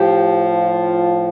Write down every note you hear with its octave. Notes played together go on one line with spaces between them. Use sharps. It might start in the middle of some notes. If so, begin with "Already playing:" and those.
Already playing: A2 F3 G4
F4